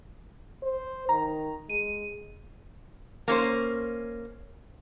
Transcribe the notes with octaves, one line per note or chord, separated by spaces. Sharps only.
C5
D#3 A#5
G#3 D#7
A#3 C#4 C5